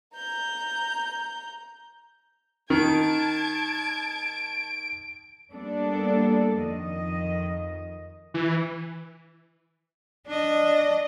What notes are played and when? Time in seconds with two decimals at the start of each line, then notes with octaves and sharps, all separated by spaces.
0.16 A#5 G6
2.70 D#3 A5 G#6 D7
5.52 G3 A#3 B3 D4 A4
6.59 F2 D#3 D#5
8.34 E3
10.27 D4 D#5